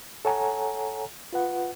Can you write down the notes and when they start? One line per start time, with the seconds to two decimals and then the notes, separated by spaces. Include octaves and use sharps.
0.25 A4 C#5 F#5 G#5 A#5
1.33 F4 B4 F#5